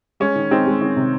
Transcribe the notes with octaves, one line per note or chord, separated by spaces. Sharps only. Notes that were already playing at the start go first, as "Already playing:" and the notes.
G#3 C#4
D#3
G#3 C4 D#4
G#3
D#3 C#4
C3